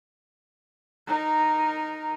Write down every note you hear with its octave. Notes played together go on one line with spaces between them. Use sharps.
D#4 A#4